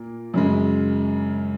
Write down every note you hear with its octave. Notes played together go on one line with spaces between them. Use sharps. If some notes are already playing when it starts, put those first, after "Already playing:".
Already playing: A#2 A#3
F#2 C#3 G#3